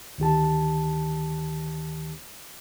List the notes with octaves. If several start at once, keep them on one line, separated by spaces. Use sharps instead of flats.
D2 D#3 G4 A5